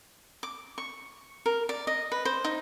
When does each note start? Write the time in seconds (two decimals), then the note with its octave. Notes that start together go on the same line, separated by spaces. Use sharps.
0.43 D6
0.78 C#6
1.46 A#4
1.69 D5
1.87 D#5
2.12 B4
2.25 C5
2.44 D#4